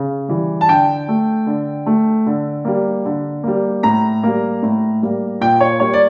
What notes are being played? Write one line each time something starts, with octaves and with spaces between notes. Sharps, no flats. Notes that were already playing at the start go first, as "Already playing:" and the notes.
Already playing: C#3
E3 G3
A5
D3 G5
A3
D3
A3
D3
G3 A#3
D3
G3 A#3
A2 A#5
G3 A#3
A2
G3 A#3
A#2 G5
C#5
G3 A#3 C#5
D5